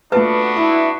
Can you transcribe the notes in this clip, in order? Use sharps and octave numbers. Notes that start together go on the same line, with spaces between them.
A3 B3 D4 F4 F#4 B4 A5
E4 E5 A5